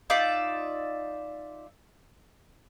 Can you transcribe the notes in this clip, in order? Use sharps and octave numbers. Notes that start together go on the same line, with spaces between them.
D#4 F4 D5 E5